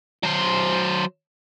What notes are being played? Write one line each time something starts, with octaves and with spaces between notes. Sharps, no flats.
F#3 C5